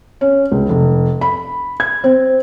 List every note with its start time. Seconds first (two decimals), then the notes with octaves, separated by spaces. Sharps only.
0.21 C#4
0.52 C#2
0.69 F1
1.21 B5
1.80 G#6
2.04 C4